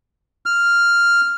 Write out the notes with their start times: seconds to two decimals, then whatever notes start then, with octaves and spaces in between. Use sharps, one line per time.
0.46 F6